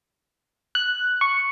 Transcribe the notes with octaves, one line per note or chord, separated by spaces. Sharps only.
F#6
C#6